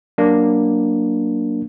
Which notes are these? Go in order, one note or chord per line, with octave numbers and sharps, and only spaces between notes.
F#3 A#3 D4